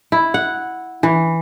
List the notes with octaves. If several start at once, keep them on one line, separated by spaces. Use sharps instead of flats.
E4
F#5
E3